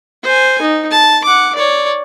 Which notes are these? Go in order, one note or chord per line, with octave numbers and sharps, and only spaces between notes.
C5 G#5
D#4
A5
F#5 D6
C#5 D5